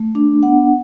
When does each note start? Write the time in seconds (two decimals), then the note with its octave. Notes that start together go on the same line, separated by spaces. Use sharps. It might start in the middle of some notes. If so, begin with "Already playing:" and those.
Already playing: A3
0.15 D4
0.43 B3 F#5